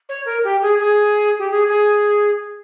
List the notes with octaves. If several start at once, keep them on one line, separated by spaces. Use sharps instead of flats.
C#5
A#4
G4
G#4
G#4
G4
G#4
G#4